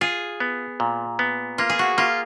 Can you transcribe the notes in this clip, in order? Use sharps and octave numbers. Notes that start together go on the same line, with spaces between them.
F4 G#4
B3
A#2
B3
A#3 F4
G#4
F#4
A#3 F4